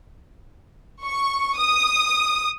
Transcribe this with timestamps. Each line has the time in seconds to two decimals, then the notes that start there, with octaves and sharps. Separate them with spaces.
1.03 C#6
1.58 D#6